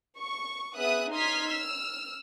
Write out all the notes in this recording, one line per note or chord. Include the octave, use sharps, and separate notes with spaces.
C#6
B3 G#4 E5 D#6 F#6
D#4 C6 D#6 F6 G#6 B6
E6 F6